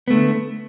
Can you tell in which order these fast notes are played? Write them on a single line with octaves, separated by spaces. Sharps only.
B3 A3 D3